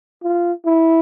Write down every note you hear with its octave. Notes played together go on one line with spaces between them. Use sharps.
F4
E4